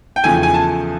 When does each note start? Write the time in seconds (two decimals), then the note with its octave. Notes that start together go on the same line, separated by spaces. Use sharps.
0.16 G5
0.24 E2 C#3 F3 A3 G#5
0.43 G#5
0.54 A5